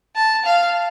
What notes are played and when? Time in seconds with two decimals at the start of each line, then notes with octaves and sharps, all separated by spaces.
0.16 A5
0.45 F5